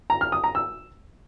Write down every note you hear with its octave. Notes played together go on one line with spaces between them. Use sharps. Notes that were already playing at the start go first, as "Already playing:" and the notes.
A#5
F6
D#6
A#5
E6